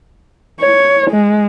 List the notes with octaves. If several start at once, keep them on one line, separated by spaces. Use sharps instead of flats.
C#5
G#3